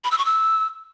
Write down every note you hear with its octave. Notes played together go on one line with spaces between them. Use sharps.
B5
E6
C#6
E6